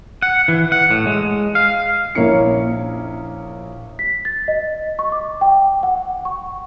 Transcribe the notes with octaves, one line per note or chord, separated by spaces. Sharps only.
F#5
E3
F#5
A2
G#3
F5
A#1 A#3 C#4 E4 C#7
B6
A6
D#5
C#6
D6
G5
F#5
C#6